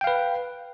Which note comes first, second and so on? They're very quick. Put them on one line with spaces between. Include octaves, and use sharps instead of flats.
G5 F5 B4